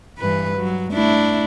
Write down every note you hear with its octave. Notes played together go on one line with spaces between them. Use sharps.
G2 E3 B4
F#3
A3 D4 E4